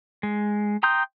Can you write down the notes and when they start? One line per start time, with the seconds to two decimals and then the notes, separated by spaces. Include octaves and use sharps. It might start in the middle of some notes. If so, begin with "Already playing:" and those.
0.23 G#3
0.83 G5 A#5 C6 D#6 G6